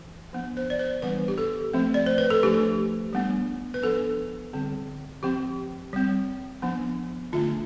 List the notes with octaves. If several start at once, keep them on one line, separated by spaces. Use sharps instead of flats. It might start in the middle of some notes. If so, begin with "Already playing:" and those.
Already playing: E3
F3 B3 D4
C5
D5
C5
E3 G3 B3 D4 B4
G4
A4
F3 A3 C4
D5
C5
B4
A4
F3 A3 D4 G4
G3 B3 D4
B4
F3 B3 D4 A4
D3 G3 C4
F3 C4 G4
G3 C4
F3 B3 D4
D3 A3 D4 F4